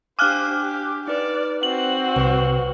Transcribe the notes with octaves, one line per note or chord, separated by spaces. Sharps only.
D4 G4 C5 F5 G#5 D6 F6 F#6
G4
D#4 B4 D5
C4 F#4 F#7
C2 B4 C#5 C#6